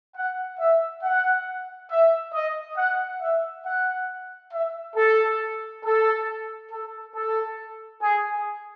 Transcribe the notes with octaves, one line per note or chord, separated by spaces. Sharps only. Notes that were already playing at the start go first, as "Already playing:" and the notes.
F#5
E5
F#5
E5
D#5
F#5
E5
F#5
E5
A4
A4
A4
A4
G#4